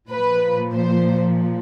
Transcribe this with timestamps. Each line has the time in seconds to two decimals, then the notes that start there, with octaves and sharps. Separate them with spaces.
0.10 A#2 F3 B4
0.73 C5